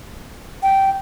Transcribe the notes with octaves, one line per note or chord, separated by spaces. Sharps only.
G5